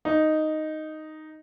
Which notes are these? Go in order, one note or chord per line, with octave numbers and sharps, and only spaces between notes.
D#4